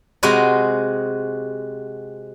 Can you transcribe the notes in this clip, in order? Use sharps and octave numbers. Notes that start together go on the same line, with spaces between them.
C3 G#3 F#4 D#5 A#5 B5